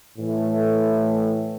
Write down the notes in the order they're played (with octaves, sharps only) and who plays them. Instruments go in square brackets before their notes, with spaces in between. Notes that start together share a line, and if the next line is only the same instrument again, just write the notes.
[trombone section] A2 E3 A3